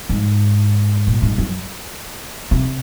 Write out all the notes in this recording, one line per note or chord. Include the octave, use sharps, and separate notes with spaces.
G#2
A#2
G#2
F#2
C3